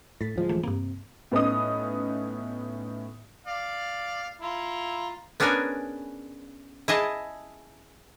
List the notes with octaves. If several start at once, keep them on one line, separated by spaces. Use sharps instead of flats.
A2 A6 B6
D1 F3 G#3
E3 A3
G2 C3 A#3
A2 B3 C#4 D#4 D#6
D5 F5
E4 F4 A#5
B3 C#4 D4 G#4 A#4 G#5
E4 G#4 D#5 A5